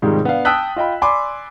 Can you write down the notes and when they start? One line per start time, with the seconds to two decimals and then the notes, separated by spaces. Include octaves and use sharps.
0.02 G#2 C3 D#3 F3 G3 G#3
0.25 B3 D4 F5
0.45 G5 A5 D#6 E6 F#6 B6
0.76 F4 D#5 G5 B5
1.02 D5 G#5 B5 C6 D6